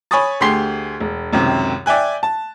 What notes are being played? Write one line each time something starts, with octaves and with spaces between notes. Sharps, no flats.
C#5 G#5 B5 C#6 D#6 A6
D2 G4 G#4 C6 C7 G7
E1
C#2 F#2 C3 D#3
D5 E5 G5 G#5 F#6
A5